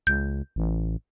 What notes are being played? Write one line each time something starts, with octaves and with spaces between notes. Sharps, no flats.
C#2 G6
A1